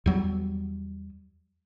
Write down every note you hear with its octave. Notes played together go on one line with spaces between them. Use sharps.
E2 F#3 G3